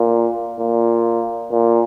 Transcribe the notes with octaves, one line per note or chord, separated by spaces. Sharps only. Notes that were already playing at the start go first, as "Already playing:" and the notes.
Already playing: A#2
A#2
A#2